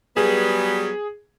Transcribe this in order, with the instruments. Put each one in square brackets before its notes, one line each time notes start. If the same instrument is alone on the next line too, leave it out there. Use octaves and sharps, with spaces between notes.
[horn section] F#3 G3 B3 [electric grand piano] G#4